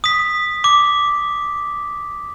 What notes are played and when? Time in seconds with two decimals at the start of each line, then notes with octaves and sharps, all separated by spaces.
0.04 D#6 B6
0.64 D6